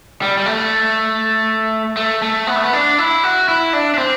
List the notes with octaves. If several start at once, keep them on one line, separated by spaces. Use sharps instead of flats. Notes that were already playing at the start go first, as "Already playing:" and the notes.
G3
G3
A3
A3
A3
B3
A3
B3
D4
E4
F#4
E4
D4
D4
C4